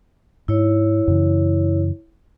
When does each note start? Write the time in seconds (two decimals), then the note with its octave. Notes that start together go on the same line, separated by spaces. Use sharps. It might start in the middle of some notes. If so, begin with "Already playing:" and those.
0.48 G#2 E4 C#5
1.08 F#2 C#3 E3